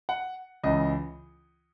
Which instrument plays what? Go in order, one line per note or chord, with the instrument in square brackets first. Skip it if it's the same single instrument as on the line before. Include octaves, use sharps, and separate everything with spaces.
[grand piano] F#5
C#2 C#3 E3 D#5